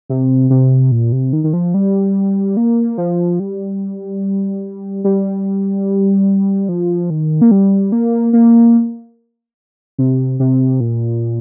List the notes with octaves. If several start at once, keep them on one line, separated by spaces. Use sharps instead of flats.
C3
C3
A#2
C3
D#3
D#3
F3
G3
A#3
F3
G3
G3
F3
D#3
A#3
G3
A#3
A#3
C3
C3
A#2